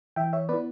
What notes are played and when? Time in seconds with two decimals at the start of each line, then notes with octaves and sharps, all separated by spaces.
0.16 E3 E5 G5
0.33 C#5 E5
0.49 B3 E4 B4 D5